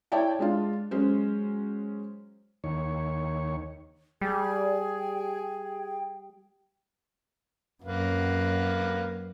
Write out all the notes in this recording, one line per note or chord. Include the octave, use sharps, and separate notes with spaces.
E4 C#5 D5 G5 A5
G#3 D4 F4
F#3 G#3 C#4 C5
D#2 C#5
G3 G#4 G5
F#2 F#3 A#3 B4 F5